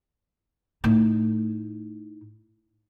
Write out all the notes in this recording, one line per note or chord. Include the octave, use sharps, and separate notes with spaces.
A2 D#4